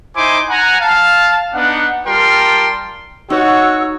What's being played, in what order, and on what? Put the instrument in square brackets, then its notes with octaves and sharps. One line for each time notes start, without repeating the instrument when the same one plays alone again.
[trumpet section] D#4 E4 C5 G#5 C6 D6
F#5 G#5 A#5
F5 A5
B3 D4 D#4 F#5
G3 F4 A#4 G5 A5 C6
[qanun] D#4 [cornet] F#4 [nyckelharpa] C#5 [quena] E6